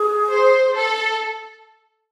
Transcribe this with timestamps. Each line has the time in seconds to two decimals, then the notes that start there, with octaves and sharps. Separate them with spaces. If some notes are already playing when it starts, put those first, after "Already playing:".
Already playing: G#4
0.32 C5
0.76 A4